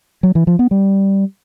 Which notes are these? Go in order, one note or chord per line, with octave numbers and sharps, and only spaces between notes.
F#3
E3
F3
B3
G3